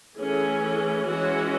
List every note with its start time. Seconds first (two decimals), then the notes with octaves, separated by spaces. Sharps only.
0.17 E3 A3 C#4 G#4
1.07 E3 G#3 C#4 F#4